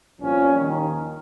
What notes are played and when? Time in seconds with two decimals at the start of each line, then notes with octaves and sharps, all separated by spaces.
0.21 C2 A#2 F3 C#4
0.57 D#2 D#3